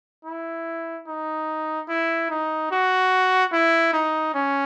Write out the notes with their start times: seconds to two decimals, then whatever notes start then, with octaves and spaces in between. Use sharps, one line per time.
0.25 E4
1.07 D#4
1.88 E4
2.30 D#4
2.71 F#4
3.52 E4
3.93 D#4
4.34 C#4